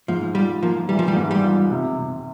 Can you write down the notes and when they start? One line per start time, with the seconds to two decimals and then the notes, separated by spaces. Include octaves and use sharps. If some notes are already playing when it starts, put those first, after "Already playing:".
0.08 G#2 F3
0.35 G3 F4
0.62 F3 A#3
0.89 E3 G3
0.99 F3
1.08 G3
1.16 G#2
1.31 G3
1.44 F4
1.71 C3
1.98 C3